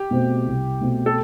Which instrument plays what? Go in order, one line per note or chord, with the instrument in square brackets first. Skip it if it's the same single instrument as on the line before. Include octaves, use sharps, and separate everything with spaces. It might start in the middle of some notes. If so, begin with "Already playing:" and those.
Already playing: [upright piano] G4
[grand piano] B2 A3 C4
C2
B2 A3 C4
[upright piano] A4